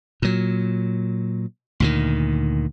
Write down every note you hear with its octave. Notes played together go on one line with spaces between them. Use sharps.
A#2 F#3
D2 A#2 D#3